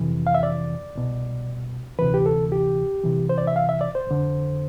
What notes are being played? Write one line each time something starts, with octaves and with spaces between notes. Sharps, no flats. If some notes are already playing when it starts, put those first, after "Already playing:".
Already playing: F2 C3 E3
F5
E5
D5
C2 B2
D2 C3 E3 B4
G4
A4
G4
C2 C3 E3
C5
D5
E5
F5
E5
D5
C5
F2 D3